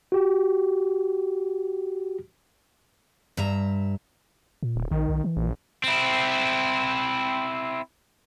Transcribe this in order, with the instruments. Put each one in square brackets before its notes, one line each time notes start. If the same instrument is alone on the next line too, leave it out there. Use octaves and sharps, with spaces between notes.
[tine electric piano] F#4 G4
[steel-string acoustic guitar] G2 E5 A#5
[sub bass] A#2
[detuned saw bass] D1
[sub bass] A#1 [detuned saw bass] D#3
[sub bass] B1
E3
[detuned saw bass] A#1
[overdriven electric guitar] C4 E4